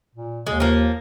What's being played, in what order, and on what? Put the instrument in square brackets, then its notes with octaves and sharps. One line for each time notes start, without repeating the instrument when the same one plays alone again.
[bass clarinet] A#2
[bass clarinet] D#2 [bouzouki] G#3
[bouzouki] F3 A#3